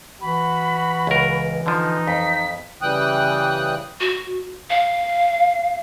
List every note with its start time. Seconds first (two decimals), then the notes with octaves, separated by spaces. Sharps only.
0.21 E3 F#4 B5
1.07 C#2 A#4
1.66 D3 F3 D#4
2.08 F2 B6
2.82 C#3 E3 G3 G5 D#6 F#6
4.01 F#4
4.70 F5